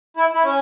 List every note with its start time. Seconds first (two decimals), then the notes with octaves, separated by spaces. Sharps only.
0.17 E4
0.34 E4
0.44 C#4